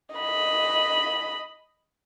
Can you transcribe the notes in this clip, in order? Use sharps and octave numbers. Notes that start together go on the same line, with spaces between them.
D#5 B5